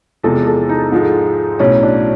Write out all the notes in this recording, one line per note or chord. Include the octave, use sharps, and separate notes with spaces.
E2 C3 F3 G#3 A4
A4
D#4
G#2 F3 G#3
B1 A2 F#3 C#4
D4